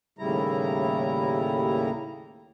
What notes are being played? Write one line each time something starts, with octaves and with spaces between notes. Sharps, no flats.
D#2 A2 C#3 G3 E4 A#5